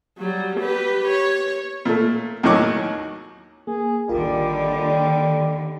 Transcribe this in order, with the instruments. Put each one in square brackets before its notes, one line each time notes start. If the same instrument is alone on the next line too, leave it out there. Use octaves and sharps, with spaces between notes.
[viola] F#3 G3
G4 B4
C#5
[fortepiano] A#2 A3
D#2 A2 D#3 F#3 C#6 D6
[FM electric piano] A#3 [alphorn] G#4
[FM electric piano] A1 F4 A#4 [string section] D#2 D3 [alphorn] G3
[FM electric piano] D#3